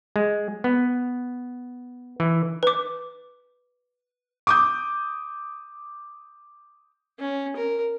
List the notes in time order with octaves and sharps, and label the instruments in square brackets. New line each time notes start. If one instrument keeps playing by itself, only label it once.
[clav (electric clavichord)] G#3
B3
E3
[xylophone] B4 D6
[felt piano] D6 D#6 G6
[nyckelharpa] C#4
A#4